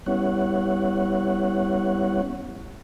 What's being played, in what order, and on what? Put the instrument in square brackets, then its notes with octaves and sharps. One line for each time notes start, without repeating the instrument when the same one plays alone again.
[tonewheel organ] G3 B3 C#4 E4 C#5 F#5